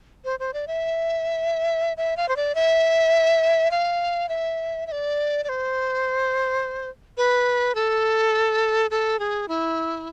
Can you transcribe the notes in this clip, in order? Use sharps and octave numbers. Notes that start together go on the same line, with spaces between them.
C5
C5
D5
E5
E5
F5
C5
D5
E5
F5
E5
E5
D5
D5
C5
B4
A4
A4
G#4
E4